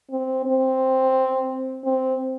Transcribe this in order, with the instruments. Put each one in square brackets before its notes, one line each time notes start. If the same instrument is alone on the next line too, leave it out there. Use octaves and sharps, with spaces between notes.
[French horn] C4
C4
C4